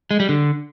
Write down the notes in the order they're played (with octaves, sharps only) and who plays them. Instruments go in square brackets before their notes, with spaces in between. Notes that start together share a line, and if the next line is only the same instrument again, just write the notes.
[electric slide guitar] G#3
G3
D3